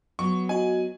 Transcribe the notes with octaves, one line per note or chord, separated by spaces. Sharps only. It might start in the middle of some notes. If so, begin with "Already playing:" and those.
F#3 B3 C#6
F#4 D#5 G#5